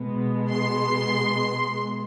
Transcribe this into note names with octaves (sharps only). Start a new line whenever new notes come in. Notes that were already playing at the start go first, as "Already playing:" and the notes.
Already playing: B2 G#3 B3
C6